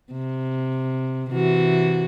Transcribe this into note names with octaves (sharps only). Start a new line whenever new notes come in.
C3
C3 E3 F#4